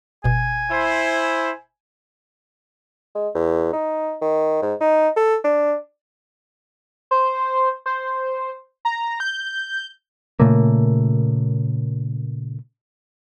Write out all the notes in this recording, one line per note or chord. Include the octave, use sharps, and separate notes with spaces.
G1 B2 G#5
E4 C5
G#3
E2
D#4
D#3
G#2
D#4
A4
D4
C5
C5
A#5
G6
A#2 C#3 A3 A#3